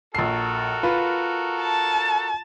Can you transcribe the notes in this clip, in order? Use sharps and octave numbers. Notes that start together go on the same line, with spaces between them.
A#1 F#4 A4 A#4 C7
F4 B4
A5